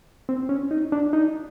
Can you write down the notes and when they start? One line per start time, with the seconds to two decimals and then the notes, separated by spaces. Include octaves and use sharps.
0.29 C4
0.49 C#4
0.71 D#4
0.92 D4
1.13 D#4